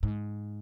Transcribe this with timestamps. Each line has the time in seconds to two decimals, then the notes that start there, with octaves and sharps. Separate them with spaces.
0.03 G#2